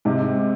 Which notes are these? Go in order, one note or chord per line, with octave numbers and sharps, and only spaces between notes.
G#2 C3